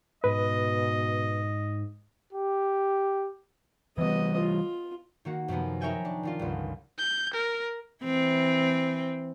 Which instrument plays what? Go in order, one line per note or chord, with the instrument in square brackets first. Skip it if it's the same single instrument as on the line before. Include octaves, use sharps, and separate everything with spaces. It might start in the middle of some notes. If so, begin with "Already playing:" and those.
[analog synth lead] G#2 [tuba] B2 [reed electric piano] B4 [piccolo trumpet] D#5
[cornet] G4
[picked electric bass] E3 G3 [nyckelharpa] B3 D#5
[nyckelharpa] F4
[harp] D#3 A#3 F#4
F#2 C3 F3 B3
D#4 A#4 C#5 E5 G5 G#5
D4
D#3 D4 F4
G1 C#2
[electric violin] G6
A#4
[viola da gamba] E3 C4